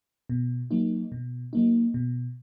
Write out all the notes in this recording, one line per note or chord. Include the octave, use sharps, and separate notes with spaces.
B2
F#3 A#3 D#4
B2
F#3 A#3 D#4
B2